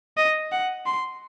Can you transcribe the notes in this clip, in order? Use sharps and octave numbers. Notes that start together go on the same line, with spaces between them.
D#5
F#5
C6